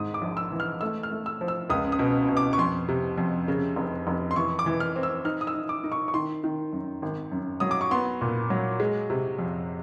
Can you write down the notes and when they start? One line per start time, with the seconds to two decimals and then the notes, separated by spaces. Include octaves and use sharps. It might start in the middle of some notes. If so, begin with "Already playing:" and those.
Already playing: G#1 G#2 D#6
0.14 D6
0.22 A#1
0.37 E6
0.52 E3
0.60 F6
0.81 A3 E6
1.03 F6
1.11 A3
1.26 E6
1.41 F3
1.48 E6
1.70 C#2 D#6
1.92 D#6
1.99 B2
2.29 B2
2.37 D6
2.53 C#6
2.58 F2 C6
2.89 C3
3.18 F2
3.48 C#3
3.76 F1
4.07 F1
4.31 C6
4.36 E3 C#6
4.59 D6
4.66 E3
4.80 F6
4.96 C4
5.03 E6
5.25 D#4 F6
5.41 D#6
5.47 E6
5.54 D#4
5.69 D6
5.84 D#4
5.92 C#6
6.08 C#6
6.14 D#3 C6
6.44 D#3
6.73 F#2
7.02 G#1
7.32 F#2
7.60 F#3 D#6
7.71 D6
7.81 C#6
7.91 B3 C6
8.21 A#2
8.50 F#3
8.80 G#3
9.10 C3
9.39 F2